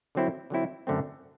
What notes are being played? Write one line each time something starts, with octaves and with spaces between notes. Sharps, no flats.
D3 F#3 C4 E4
D3 F#3 C4 E4
F#2 D3 A3 C4